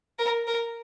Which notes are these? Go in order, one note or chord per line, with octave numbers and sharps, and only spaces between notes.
A#4
A#4